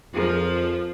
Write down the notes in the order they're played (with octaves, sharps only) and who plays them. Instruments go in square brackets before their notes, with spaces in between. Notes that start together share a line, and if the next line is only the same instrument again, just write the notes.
[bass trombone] F2 [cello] F3 [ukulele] F4 G#4 A#4